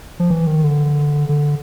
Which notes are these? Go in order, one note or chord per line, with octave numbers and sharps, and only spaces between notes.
F3
E3
D#3
D3
D3